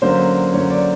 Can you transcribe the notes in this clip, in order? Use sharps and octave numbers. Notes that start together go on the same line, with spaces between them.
D3 F#3 A#3 C#4 C5
D3 F#3 A#3 C#4 C#5
D5